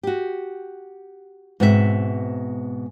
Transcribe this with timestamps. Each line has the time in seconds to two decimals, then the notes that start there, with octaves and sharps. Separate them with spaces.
0.03 F#4 G4
1.60 G#2 B2 B3 C4 E4 E5